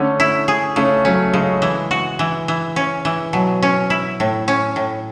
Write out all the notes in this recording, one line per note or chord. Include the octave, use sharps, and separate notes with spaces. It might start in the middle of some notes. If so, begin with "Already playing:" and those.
Already playing: D3 A3 C#4
E4
G#4
C#3 A3 C#4
F#3 A3 C#4
C#3 G#3
E3
F#4
E3
E3
C#4
E3
B2 F#3
C#4
E4
A2
C#4
A2